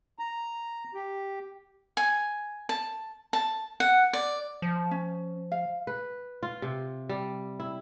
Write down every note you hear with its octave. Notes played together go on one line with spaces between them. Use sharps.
A#5
G4
G#5
A5
A5
F#5
D5
F3
C#4
F5
B4
F4
C3
G3
E4